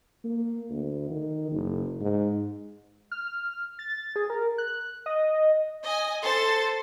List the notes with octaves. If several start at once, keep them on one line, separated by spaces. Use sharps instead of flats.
A#3
D2
D#3
F#1
G#2
F6
A6
G#4
A#4
F#6
D#5
D#5 G#5
A4 C5 C6 A6